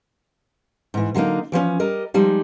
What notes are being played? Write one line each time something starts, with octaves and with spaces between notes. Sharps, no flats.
G#2 E3
D3 F#3 G#3 A#3 D#4
E3 F3 A3 C#4
G3 A#4 D#5
F3 G3 G#3 D#4